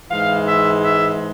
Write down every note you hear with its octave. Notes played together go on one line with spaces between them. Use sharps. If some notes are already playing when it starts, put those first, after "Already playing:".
G#2 E3 G#3 F5
E5
E5